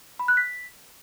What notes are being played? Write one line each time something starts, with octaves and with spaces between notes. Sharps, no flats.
B5
F#6
B6